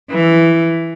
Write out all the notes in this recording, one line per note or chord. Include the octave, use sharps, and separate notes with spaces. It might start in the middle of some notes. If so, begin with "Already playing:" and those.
E3